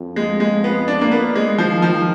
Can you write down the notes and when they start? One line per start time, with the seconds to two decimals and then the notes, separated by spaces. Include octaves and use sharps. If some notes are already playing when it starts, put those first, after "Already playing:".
Already playing: F2
0.16 G#3
0.40 G#3
0.64 B3
0.88 D4
1.01 A#3
1.12 B3
1.35 G#3
1.58 D#3 F3
1.82 F3